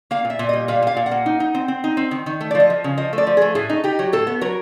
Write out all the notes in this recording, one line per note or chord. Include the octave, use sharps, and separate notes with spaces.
A#3 F5
A#2
E5
A#2
G3 D#5
A#2 F5
A#2 F5
A#2
F#5
A#3
D#4
D#4
C4
C4
D#4
C4
D#3
D#3
A3
D5
F3 D#5
F3
C#3
F3 D#5
A3
D5
F3
A3 G#4
A2 G#4
D#4
D#4 G4
F#3
A2 A4
B3
F#3 A#4